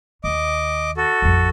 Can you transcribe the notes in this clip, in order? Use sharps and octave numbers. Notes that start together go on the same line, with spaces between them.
D#2 D#5 D6
F#4 A4
A1 F2